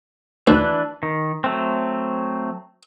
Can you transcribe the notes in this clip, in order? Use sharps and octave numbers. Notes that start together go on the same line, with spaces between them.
D2 E3 D4 B4
D#3
F#3 A3 C4